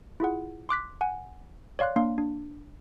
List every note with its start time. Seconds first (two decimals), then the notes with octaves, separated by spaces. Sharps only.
0.20 E4 F4 G#4 F#5
0.69 C6 D6 F#6 B6
1.01 F#5 G#5
1.79 C#5 D5 F5 C6 F#6
1.96 A#3 D4 F5 C6
2.18 D4